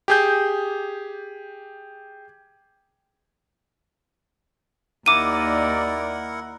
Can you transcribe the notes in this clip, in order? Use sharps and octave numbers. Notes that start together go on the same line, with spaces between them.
G4 G#4 G6
D#2 D#4 E4 A#4 D5 F#5 D6 D#7